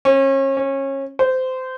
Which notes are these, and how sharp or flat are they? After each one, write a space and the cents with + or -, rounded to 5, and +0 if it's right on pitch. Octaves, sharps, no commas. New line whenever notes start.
C#4 -35
C#4 -25
C5 -20